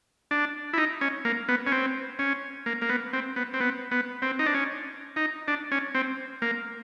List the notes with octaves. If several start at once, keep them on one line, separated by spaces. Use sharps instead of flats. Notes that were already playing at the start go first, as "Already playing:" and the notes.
D4
E4
D#4
C#4
A#3
B3
C#4
C4
C#4
A#3
A#3
B3
C4
B3
C4
B3
B3
C4
D#4
D4
C#4
D#4
D4
C#4
C4
A#3